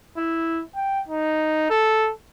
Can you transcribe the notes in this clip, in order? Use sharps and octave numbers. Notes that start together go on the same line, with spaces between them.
E4
G5
D#4
A4